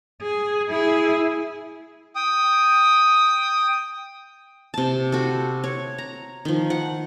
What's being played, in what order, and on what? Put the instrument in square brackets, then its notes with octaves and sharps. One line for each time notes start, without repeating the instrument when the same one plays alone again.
[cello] G#4
E4 G#4
[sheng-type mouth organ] G5 D#6
[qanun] C3 A5
F#4 A4
C#5
A#5
D#3 F3
F#5